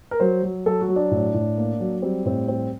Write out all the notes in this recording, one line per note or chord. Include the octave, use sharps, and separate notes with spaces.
A#4
F#3 C5
F#3
F#3 A4
F#4
F#3
D4
A2
A2
A#3
F#3
G3 C4
A2 C4
G3 C4